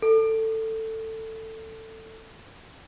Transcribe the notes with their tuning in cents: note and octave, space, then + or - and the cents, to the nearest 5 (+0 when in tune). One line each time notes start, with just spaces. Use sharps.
A4 +15